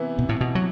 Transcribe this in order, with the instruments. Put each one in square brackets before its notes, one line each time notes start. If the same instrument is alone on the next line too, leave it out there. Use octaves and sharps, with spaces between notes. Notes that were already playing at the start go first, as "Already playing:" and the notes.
Already playing: [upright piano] C3 E3 B3 E4
[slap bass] B2
A2
B2
F#3